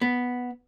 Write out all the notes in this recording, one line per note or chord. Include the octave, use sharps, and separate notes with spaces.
B3